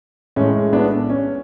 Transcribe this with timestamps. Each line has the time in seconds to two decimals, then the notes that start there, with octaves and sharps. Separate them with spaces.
0.36 A2 G#3 C#4
0.73 B3 D4
1.09 C#4